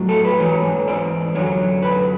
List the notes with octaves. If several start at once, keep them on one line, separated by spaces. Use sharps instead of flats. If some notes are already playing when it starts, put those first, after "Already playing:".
Already playing: A2 F#3
A4
B4
G#2 E3 C#5
D5
F#2 D3 F#3 C#5
B4